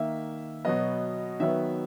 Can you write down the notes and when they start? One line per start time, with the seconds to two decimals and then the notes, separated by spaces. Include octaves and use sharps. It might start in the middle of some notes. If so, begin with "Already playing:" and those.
Already playing: D#3 A#3 E5
0.65 B2 F#3 B3 D#5
1.40 D#3 F#3 B3 E5